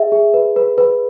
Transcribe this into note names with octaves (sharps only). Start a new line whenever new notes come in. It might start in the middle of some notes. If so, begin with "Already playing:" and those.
Already playing: G#4 E5
G#4
B4
B4
B4